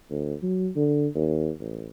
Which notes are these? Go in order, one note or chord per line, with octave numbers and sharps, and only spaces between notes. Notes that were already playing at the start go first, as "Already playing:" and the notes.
D2
F#3
D3
D#2
A1